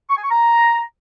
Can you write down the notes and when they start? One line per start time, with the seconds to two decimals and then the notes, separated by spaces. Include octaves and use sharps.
0.10 C#6
0.17 G#5
0.24 C#6
0.31 A#5